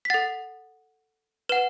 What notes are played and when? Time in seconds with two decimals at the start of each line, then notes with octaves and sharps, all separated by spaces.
0.05 B6
0.10 A4 F#5 A6
1.49 B4 F#5 E7